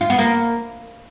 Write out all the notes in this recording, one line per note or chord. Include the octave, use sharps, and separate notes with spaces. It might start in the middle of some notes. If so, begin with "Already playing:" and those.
F4
B3
A#3